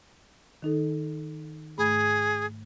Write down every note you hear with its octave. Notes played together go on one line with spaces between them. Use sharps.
D#3 D#4 A4
G#2 A3 G#4 B5